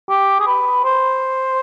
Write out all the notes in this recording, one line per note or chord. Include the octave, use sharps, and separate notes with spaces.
G4
G#4
B4
C5